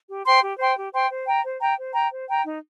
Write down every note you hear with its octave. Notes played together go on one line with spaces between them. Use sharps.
G4
C5 G5 C6
G4
C5 G5 C6
G4
C5 G5 C6
C5
G5 A#5
C5
G5 A#5
C5
G5 A#5
C5
G5 A#5
D#4